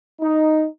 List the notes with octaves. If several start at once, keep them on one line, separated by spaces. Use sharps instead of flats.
D#4